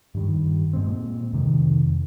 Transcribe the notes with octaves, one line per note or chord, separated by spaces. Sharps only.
G2 D#3 G3
A#2 G#3 C4
F2 C3 D#3